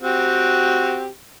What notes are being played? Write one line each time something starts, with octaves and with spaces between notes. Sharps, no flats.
C4 F#4 G4